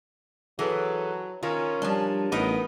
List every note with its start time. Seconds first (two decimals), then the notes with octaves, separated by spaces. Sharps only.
0.59 E3 F#3 G#4 A4 B4
1.43 D#3 C#4 F4 A#4 C#5
1.82 F3 G3 D4
2.32 A1 B3 D#4 A#4 B4